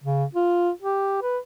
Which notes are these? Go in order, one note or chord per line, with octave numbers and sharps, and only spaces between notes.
C#3
F4
G4
B4